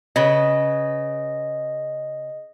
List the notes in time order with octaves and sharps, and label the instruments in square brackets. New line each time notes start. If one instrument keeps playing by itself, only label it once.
[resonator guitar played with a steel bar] C#3 B4 [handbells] D#5